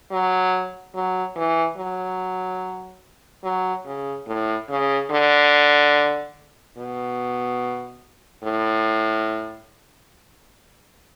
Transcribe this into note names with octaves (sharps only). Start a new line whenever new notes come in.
F#3
F#3
E3
F#3
F#3
C#3
A2
C#3
D3
B2
A2